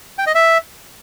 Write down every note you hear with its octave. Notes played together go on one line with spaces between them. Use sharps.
G5
D#5
E5